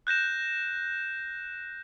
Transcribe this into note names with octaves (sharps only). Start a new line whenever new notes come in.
F#6 G6 A#6 E7